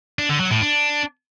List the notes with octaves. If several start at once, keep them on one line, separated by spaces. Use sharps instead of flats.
D4
D3
F#3
A2
D4